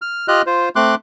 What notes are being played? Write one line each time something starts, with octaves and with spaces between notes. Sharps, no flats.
F6
F4 G4 D#5 F6 F#6
F4 C5
A3 C4 C6 D6 F#6